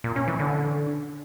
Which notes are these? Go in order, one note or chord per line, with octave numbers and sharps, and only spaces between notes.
A#2
C#4
E3
D3